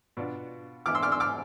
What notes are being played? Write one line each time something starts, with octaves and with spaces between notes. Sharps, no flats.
B2 B3 D4 F4
E3 B3 E4 D6 F6
C6 E6
D6 F6
C6 E6
D6 F6